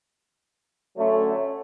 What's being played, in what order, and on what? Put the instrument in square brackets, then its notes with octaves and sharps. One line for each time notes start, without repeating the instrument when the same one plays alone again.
[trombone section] D3 F#3 A3 C#4